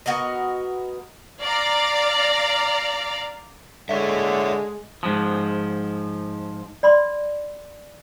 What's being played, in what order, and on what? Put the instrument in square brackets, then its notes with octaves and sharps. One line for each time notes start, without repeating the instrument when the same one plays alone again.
[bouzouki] B3 F#4 A#4 D#5
[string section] D5 F5 A#5
[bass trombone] D3 [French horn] G#3 [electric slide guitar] A4 C#5 E5
[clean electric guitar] G#2 F3
[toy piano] D5 B5 C6